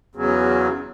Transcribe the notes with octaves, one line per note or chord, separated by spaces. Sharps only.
E2 C#3 F#3